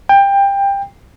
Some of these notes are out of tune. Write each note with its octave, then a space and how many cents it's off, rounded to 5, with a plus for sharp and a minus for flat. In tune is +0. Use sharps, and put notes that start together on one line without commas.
G5 +20